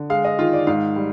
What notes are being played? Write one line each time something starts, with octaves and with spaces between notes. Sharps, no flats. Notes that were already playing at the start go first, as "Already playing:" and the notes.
Already playing: D3
G#3 F5
D#5
D#3 F4
D5
G#2 F5
G3